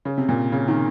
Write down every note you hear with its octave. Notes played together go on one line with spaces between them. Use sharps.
C#3
C3
A#2
C#3
D#3